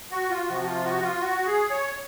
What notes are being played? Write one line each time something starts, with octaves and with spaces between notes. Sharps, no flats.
F#4
F4
C3 F3 F#4
F#4
F4
F#4
F4
F#4
G#4
C#5